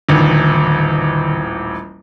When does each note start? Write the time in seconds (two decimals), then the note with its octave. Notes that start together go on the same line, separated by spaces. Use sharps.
0.09 D#1 A1 D3 D#3